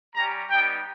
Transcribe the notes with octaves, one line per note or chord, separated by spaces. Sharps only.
G3 C#4 G4 A#5
G3 B3 D#4 G5